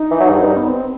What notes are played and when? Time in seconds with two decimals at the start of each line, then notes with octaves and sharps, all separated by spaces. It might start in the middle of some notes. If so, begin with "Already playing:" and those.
Already playing: D#4
0.11 E3
0.20 F#3
0.30 G2
0.38 F#2
0.42 G2
0.57 B3
0.68 C4